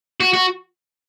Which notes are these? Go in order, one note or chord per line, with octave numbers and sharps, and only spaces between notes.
F#4
F#4